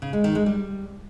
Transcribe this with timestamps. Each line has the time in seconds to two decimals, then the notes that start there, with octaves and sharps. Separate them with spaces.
0.02 C#3
0.13 G#3
0.24 D#3
0.35 G#3
0.46 G3